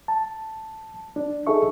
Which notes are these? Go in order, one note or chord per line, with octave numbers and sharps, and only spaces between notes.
A5
D4
D#4 G#4 A4 E5 C#6